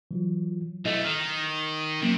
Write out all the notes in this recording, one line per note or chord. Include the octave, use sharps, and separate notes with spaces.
E3 F#3 F4
B1 A3 E4 D#5
D#3 F6
C3 F#3 A#3 C#4